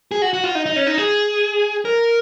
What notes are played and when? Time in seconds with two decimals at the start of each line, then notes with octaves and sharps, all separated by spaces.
0.12 G#4
0.22 F#4
0.33 F#4
0.44 F4
0.55 D#4
0.66 D#4
0.76 C#4
0.87 D#4
0.98 G#4
1.85 A#4